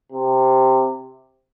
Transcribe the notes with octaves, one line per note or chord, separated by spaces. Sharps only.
C3